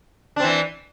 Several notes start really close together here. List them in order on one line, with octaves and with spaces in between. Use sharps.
D4 C4 E3